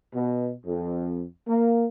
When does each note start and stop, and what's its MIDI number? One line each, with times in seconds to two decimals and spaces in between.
0.14 0.51 47
0.67 1.23 41
1.47 1.86 58